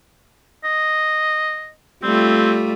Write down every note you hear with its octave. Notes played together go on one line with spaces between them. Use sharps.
D#5
G3 A3 C4 F4